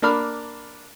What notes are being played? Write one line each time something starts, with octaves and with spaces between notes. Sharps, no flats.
A#3 D4 B5 F6